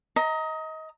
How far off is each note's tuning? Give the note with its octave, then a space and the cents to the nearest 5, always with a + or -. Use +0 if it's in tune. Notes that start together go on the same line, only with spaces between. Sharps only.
D#5 +25 A#5 -10